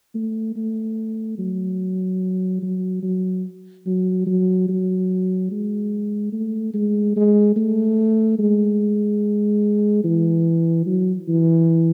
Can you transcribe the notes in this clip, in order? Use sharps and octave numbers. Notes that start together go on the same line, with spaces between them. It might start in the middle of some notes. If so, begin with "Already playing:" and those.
A3
A3
F#3
F#3
F#3
F#3
F#3
F#3
G#3
A3
G#3
G#3
A3
G#3
E3
F#3
E3